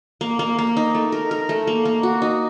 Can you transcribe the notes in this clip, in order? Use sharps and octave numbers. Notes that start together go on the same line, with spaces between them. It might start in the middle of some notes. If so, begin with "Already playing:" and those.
A#3
A#3
A#3
D#4
A3
A#4
A#4
A3
A#3
A#3
F#4
D#4